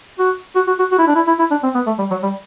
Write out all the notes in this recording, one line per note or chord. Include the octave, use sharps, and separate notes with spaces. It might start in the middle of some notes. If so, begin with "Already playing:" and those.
F#4
F#4
F#4
F#4
F#4
E4
D4
E4
E4
E4
D4
C4
B3
A3
G3
F#3
G3